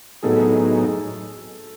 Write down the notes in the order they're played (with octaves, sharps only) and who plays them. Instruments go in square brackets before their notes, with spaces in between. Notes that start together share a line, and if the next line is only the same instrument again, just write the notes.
[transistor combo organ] A2 F#3 B3 D#4 G#4 [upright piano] A4